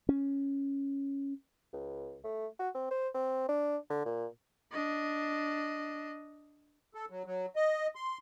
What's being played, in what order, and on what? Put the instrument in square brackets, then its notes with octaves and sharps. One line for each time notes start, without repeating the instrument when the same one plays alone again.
[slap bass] C#4
[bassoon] C#2
A3
F#4
C4
C5
C4
D4
D3
A#2
[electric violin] D4 D#5
[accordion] A4
F#3
F#3
D#5
C6